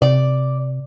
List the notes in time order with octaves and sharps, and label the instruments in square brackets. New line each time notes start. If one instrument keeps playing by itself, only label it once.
[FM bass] C3 [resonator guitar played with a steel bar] D5